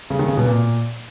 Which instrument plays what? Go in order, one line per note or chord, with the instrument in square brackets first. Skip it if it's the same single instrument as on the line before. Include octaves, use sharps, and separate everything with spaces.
[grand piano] C#3
D#3
C#3
B2
A#2